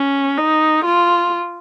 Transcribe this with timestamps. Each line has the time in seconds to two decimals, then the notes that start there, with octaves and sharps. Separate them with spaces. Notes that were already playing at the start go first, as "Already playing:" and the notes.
Already playing: C#4
0.38 D#4
0.85 F4